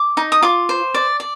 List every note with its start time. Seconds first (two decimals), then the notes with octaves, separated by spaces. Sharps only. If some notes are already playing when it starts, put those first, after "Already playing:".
Already playing: D6
0.17 D#4
0.32 D#6
0.42 F4 D6
0.69 C5
0.94 D5
1.20 D5